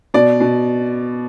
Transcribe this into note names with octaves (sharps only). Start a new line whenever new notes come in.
B2 D5
B2